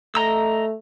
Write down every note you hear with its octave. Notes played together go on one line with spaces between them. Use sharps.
A3 D#5 A#5 E6